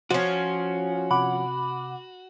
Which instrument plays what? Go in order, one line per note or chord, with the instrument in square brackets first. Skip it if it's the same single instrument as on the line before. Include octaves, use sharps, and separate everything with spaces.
[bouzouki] F3 C#4 [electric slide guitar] F#4
[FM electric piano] C3 F#5 D6 [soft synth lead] B5